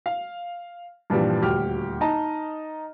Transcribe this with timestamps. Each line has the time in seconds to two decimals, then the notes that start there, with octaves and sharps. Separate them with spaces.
0.06 F5
1.10 G2 A#2 E3 F3 G3
1.42 D#1 D2 F#4 G4 F6
2.01 D#4 D#5 A5 A#5